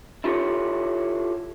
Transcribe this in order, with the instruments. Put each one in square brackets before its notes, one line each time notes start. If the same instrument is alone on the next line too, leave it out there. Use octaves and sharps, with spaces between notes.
[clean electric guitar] E4 F4 G4 A4 C#5